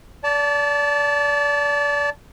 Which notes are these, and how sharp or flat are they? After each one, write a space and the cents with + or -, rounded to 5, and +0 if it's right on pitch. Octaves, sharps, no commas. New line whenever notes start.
D5 -30 A5 +0